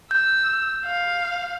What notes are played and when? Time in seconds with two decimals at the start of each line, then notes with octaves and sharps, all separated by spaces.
0.11 E6 G6
0.85 F5